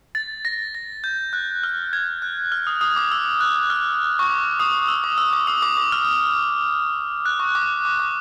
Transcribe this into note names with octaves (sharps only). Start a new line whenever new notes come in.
A6
A#6
A#6
G6
F#6
F6
G#6
F#6
F6
D#6
D#6
D6
E6
F#6
F6
C#6
D6
D#6
E6
D6
E6
D6
D#6
D6
D6
F6
F#6
C#6
D6
D6
D6